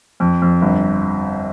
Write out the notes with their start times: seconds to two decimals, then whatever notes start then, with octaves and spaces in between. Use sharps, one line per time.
0.20 F2
0.42 F2
0.62 G1